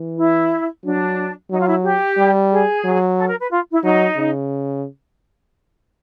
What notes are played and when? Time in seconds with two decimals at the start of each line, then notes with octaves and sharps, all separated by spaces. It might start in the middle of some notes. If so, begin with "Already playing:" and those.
Already playing: E3
0.18 E4
0.84 F#3 D4
1.50 F#3 D#4
1.59 F4
1.67 E4
1.83 G4
2.17 G3
2.51 G#4
2.84 F#3
3.16 A4
3.27 A#4
3.40 B4
3.51 F4
3.72 E4
3.83 F#3 D#4
4.16 C#3